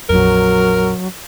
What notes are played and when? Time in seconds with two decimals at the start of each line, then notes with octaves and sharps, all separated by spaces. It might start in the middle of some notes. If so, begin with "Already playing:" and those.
0.09 A#1 F2 F#3 A#4